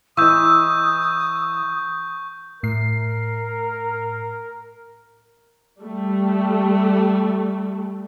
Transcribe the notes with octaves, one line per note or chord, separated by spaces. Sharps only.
E3 D#5 C#6 D#6 E6 G6
A2 A#4 C7
G3 A3